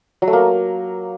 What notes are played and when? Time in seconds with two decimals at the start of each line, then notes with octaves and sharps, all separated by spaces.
0.22 F#3
0.27 A3
0.33 A#3